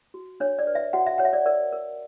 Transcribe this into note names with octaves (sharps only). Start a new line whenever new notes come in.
F#4
D4 C#5
D5
B4
E5
F#4 F#5
E5
C#5 F#5
E5
D5
A#4 D5
A#4